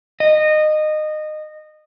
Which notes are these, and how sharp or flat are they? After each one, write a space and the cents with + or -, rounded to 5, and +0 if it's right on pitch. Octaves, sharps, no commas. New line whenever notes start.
D#5 -20